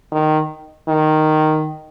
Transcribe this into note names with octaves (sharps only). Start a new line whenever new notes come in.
D#3
D#3